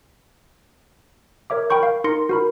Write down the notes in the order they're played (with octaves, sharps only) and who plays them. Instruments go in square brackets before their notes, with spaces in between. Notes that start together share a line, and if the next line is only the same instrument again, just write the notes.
[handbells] A#4 C#5 E5 D6
A#4 G5 B5 C#6 G6
F5
D#4 A#4 C6 A#6 C#7
F#4 A#4 B5